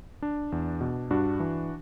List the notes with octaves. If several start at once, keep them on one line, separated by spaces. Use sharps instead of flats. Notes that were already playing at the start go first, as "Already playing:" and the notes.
D4
E2
B2
G2 D4 F#4
E3